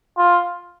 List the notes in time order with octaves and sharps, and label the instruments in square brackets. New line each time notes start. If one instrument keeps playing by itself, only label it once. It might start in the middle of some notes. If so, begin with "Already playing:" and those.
[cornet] F4